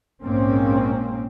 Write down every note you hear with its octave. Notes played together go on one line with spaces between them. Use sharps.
A#1 G#2 A#3 C4 C#4